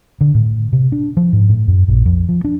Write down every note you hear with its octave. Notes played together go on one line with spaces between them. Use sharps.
D3
A2
C3
D4
F3
G#2
A2
F#2
A#1
F2
F3
D4